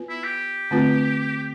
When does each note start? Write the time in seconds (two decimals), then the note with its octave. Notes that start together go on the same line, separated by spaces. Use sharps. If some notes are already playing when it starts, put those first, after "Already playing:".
Already playing: B3 F4 B4
0.09 E4
0.24 G4
0.71 D3 A3 C4 F4 B4